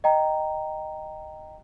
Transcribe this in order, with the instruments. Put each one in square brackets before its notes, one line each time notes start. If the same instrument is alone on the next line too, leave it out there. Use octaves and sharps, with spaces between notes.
[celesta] D#5 G5 A#5